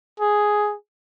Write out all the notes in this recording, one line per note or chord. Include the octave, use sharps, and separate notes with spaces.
G#4